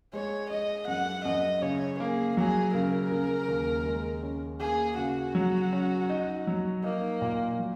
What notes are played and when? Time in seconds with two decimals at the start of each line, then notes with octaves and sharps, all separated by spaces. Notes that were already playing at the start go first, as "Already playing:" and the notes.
0.13 G#3 C#5
0.50 G#3 D#5
0.88 F#2 F#5
1.25 F#2 D#5
1.62 C#3 C#5
2.00 A#3 G#4
2.36 F#3 G#4
2.74 C#3 A#4
3.12 C#3
3.49 D#2
3.86 G#3
4.23 C#4
4.60 A#3 G#4
4.98 C#3 F#4
5.35 F#3
5.73 C#4
6.10 D#4
6.47 F#3
6.84 A#3 D#4
7.22 A#2
7.59 F#3